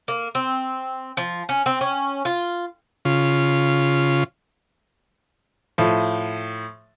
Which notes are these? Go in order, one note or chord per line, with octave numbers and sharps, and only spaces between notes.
A#3
C4
F3
C#4
C4
C#4
F4
C#3 F4
A2 F3